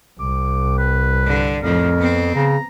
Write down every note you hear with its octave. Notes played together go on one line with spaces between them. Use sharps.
C2 D6
B4
G2 D3
F2 A2 F3 A#4
B3 C4
C#3 A#5